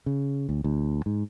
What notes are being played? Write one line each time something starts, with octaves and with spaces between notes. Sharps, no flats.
C#3
D2
D2
G#2